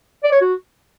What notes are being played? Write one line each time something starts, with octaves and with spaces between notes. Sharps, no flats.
D5
C#5
F#4